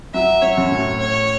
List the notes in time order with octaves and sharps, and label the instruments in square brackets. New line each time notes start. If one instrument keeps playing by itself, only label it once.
[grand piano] F#3 [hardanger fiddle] E5
[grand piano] F#3 [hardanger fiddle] C#5
[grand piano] F#2
A2
[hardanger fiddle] C#5